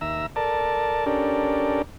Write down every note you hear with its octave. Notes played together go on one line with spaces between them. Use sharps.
D#2 E5 A#5 E6
A4 A#4 D5 A5
C#4 D4 G4 A4 A#4 D5